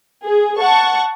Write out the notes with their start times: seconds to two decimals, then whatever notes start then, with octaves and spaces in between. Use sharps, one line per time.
0.24 G#4
0.59 F#5 A5 C#6